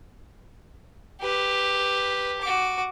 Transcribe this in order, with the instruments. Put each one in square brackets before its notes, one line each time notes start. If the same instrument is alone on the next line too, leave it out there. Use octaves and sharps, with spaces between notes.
[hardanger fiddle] G4 [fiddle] B4
[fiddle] F#4 D6